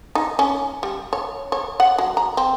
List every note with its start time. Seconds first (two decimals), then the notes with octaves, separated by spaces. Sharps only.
0.15 D#4
0.39 C#4
0.83 G3
1.13 C#5
1.52 C#5
1.80 F#5
1.98 F#3
2.17 A#5
2.37 C4